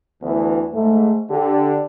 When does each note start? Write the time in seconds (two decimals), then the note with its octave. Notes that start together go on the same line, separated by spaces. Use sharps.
0.22 D2 E3 B3
0.73 G#2 A3
1.30 D3 G4